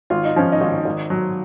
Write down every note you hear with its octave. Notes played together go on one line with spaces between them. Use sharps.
G#1 F4
D#4
F3 C#4
D#4
G#1
G#1
F#3